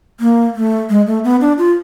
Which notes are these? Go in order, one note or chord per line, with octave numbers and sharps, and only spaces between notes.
A#3
A3
G#3
A3
B3
D4
F4